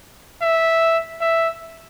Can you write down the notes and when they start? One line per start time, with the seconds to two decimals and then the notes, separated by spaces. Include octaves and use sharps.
0.42 E5
1.21 E5